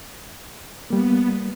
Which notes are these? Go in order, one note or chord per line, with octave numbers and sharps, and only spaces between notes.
G3 A#3 B3